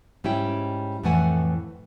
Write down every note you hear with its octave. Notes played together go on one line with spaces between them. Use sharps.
G#2 G3 C#4 E4 G5
F2 A2 E3 A3 F#5 G#5